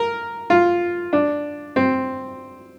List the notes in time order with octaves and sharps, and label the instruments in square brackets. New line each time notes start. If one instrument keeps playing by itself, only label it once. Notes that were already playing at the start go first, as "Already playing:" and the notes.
Already playing: [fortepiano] A#4
F4
D4
C4